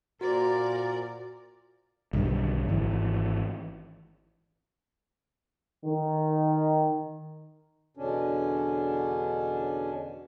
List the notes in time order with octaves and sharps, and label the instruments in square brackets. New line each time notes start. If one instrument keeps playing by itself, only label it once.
[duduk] A#2 [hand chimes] F#4 C5 [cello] A#4 D5
[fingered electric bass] B1 G2 D3 D#3
G#1 E3
[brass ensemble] D#3
[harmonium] E2 B2 D3 C#4 D4